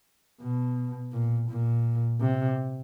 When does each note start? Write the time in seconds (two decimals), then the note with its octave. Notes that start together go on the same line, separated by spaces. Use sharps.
0.41 B2
1.13 A#2
1.50 A#2
2.21 C3